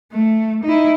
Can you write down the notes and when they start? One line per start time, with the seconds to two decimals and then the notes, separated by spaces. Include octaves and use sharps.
0.12 A3
0.64 D#4 E4